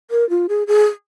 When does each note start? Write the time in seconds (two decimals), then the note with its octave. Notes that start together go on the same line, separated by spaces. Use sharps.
0.11 A#4
0.30 F4
0.49 G#4
0.67 G#4